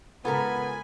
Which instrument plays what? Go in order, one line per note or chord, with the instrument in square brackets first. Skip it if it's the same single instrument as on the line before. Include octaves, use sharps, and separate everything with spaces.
[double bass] G#2 C#3 [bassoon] B3 [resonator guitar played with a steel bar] F4 A4 A#4 [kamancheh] G#5 B5